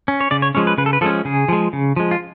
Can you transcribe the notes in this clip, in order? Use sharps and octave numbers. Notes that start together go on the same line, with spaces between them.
C#4
C#5
C#3 D5
C#5
F3 G#3 C#4 C#5
B4
C#3 B4
A4
B4
F3 G#3 C#4 A4
C#3 G#4
F3 G#3
C#3
F3 G#3
F4